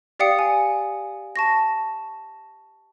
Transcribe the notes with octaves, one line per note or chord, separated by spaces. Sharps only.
G4 D5 F5 G5 D#6 C#7
G#5
A5 C#6 A#6